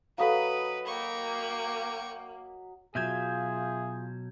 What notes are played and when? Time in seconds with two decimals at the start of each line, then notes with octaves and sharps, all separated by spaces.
0.18 F#3 A4 B4 D#5 F5 B5
0.86 A#3 G5 C#6
2.95 B2 F#3 F4 G#4 E5 G6 G#6